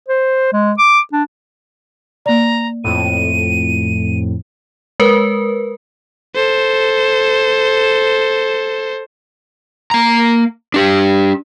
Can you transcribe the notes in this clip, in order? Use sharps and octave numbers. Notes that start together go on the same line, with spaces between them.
C5
G#3
D6
D4
A#3 D5 A#5
F2 A2 D#7
G#3 A#4 B4
A4 C5
A#3 A#5
D4 G4